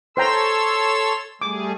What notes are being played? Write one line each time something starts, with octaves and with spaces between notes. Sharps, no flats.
A4 C5 C#5 G5 A#5 C6 E6
G3 A3 G#4 D6